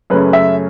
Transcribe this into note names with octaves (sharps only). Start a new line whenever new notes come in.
F#2 C#3 A3 C#4 B4
E5